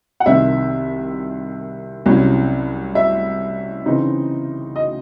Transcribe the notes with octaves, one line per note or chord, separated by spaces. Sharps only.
F#5
C2 C3 D#3 E5
C2 C3 F#3 C#4 E4
E5
C#3 E3 C4 D#4
D#5